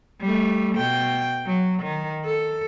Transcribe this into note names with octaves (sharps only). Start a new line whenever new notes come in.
G3 A3
B2 G5
F#3
D#3
A4